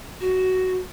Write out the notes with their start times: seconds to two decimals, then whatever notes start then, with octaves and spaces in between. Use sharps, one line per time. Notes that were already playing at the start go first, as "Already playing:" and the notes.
0.20 F#4